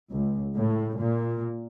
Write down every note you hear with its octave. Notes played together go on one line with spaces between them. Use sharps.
C#2
A2
A#2